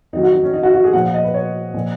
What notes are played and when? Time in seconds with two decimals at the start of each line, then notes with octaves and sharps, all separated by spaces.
0.13 F2 D#3 F#3 D#4
0.23 F#4
0.33 D#4
0.44 C#4
0.54 D#4
0.63 F#4
0.74 F#4
0.84 G#4
0.93 A#2 F3 F#5
1.04 F5
1.14 D#5
1.24 B4
1.34 C#5
1.74 A#2 F3